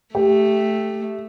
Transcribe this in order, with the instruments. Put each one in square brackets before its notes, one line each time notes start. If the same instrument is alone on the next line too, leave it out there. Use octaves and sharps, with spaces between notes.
[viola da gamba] A3 [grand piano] G4